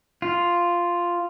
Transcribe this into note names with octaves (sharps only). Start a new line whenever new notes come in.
F4